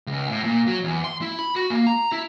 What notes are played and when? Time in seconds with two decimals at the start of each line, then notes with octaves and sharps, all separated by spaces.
0.07 C#2
0.29 A2
0.44 A#2
0.67 F#3
0.84 E2
1.04 C6
1.22 E4
1.39 B5
1.56 F#4
1.70 A#3
1.87 A#5
2.12 E4